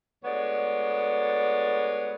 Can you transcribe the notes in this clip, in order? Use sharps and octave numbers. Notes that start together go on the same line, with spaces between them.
D2 G#3 B3 C#5 D5